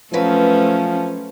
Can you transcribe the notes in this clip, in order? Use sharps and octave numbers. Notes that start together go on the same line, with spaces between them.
F3 F#3 A3 C#4 B4 C5